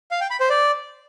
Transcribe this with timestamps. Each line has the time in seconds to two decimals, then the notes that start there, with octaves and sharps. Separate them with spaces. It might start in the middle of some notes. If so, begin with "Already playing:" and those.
0.11 F5
0.21 G5
0.30 B5
0.40 C5
0.50 D5